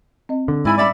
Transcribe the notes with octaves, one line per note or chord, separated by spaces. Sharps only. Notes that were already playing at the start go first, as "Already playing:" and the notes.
C4 D#5
D3
G#2 E4 D5 G#5 B5
A2 G3 C#4 D5 E5 B5